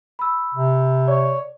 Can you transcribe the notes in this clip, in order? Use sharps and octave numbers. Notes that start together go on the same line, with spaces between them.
B5 E6
C3
C#5 D5